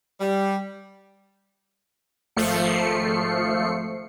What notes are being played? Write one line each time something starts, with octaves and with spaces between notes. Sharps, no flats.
G3
G#1 F3 A3 C7 C#7